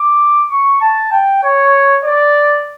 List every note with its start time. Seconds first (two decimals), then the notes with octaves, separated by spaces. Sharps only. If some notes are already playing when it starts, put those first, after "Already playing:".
Already playing: D6
0.51 C#6
0.81 A5
1.12 G5
1.43 C#5
2.05 D5